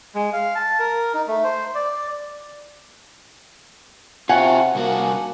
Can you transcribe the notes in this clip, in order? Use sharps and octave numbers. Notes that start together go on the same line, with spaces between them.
G#3
F5
A5
A#4
D#4
A3
C5
D5
C3 F4 F#4 F#5 G#5 A5
C2 A#3 F#4